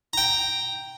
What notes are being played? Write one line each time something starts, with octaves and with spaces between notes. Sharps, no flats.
G5 A#5